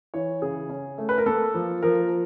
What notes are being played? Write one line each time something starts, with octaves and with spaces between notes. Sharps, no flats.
E3 C#5
C#3 G#4
C#4
A3
B4
A#4
A#3 A4
F3
F3 A#4